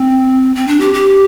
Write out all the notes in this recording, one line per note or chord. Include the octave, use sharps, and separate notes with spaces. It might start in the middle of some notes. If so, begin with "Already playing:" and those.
Already playing: C4
C4
D4
G4
G4